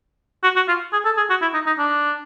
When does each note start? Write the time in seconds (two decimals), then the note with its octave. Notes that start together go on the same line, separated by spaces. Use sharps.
0.43 F#4
0.56 F#4
0.68 F4
0.93 G#4
1.05 A4
1.17 G#4
1.30 F#4
1.42 E4
1.54 D#4
1.66 D#4
1.79 D4